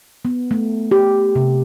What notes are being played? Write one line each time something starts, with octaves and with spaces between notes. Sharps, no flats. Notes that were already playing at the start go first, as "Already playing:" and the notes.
B3
A3
G4
C3